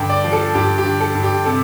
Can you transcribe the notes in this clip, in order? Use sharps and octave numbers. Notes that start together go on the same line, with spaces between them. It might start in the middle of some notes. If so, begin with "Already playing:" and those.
Already playing: G2 D3 G5 A5
D5
F3
A4
G2 G4
G4
D3
A4
G2
G4
C3 A4